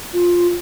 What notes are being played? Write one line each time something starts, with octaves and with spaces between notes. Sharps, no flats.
F4